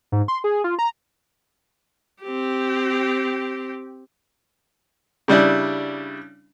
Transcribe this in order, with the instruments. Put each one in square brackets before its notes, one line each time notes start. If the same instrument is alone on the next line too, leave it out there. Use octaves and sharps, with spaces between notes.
[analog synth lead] G#2
C6
G#4
F4
A#5
[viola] C4 G4
[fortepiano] C#3 G3 D4 E4